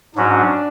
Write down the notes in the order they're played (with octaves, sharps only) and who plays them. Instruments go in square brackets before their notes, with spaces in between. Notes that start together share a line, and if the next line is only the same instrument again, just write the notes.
[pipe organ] G#2 F#3 C#4 F#4 [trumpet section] D4